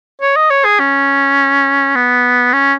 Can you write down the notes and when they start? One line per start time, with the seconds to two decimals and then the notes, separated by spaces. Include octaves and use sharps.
0.22 C#5
0.36 D#5
0.51 C#5
0.65 G#4
0.80 C#4
1.96 B3
2.54 C#4